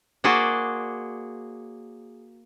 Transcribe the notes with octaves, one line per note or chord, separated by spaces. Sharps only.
A#3 F#4 G#4 C5 D5